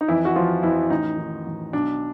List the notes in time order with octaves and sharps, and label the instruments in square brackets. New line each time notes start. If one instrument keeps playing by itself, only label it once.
[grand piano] D#4
F2 E3 E4
F#4
E3 F3 F4
F2 E3 E4
A1 D#4
D#3
A1
B1 D4